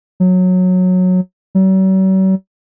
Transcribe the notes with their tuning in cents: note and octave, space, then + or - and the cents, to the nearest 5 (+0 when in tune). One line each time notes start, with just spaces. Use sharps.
F#3 -15
F#3 +45